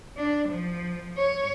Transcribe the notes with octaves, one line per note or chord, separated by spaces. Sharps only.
D4
F3
C#5